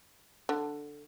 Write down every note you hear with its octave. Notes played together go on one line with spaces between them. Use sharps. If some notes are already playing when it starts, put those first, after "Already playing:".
D3